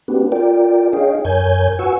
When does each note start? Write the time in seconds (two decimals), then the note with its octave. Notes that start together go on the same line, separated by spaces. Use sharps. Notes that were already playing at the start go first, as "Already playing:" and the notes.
0.08 A#3 C4 D4 F#4 G4 B4
0.32 F4 A#4 D5 G5
0.93 D4 G#4 C#5 D#5 F5 G5
1.25 F#2 A#4 C#5 G#5 G6 G#6
1.79 F#4 B4 F#5 G#5 C#6 E6